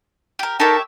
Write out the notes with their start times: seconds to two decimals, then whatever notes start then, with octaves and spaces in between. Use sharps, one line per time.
0.39 G4 A#4
0.60 D#4 G4 A4 A#4 C#5 E5 A5